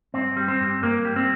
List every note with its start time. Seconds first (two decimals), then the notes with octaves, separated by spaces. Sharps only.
0.14 G2 C4
0.37 G3
0.48 C4
0.60 G2
0.82 G2 A#3
1.05 G3
1.16 C4